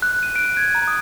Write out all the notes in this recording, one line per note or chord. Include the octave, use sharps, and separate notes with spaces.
F#6
D#7
D7
G#6
A#5
D#6